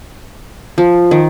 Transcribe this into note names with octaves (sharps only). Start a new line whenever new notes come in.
F3
D#3